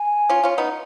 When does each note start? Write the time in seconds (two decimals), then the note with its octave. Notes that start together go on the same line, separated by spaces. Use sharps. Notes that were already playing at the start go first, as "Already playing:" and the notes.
Already playing: G#5
0.29 C#4 F4
0.44 C#4 F4
0.58 B3 D#4